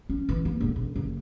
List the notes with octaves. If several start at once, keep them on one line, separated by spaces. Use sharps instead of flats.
C#4
E3
A#3
E1
E1
F#1